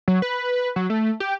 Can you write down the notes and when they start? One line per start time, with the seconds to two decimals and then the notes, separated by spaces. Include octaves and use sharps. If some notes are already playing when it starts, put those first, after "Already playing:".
0.08 F#3
0.22 B4
0.76 F#3
0.90 A3
1.20 G4